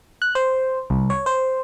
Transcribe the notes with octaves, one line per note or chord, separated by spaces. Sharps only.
F#6
C5
C2
C#5
C5